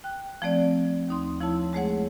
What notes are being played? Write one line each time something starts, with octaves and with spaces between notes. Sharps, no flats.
G5 F#6
F3 A3 C4 D5
D#2 D#4 C6
F3 E4 C#5 A5
G#3 A3 G#4 C#5 F#5